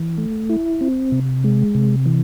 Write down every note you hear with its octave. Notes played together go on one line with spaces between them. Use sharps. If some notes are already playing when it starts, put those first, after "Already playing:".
Already playing: E3
A3
E4
C4
C3
G#3
C3
E3